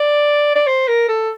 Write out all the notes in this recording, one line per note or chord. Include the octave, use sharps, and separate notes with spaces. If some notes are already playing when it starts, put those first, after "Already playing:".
Already playing: D5
D5
C5
A#4
A4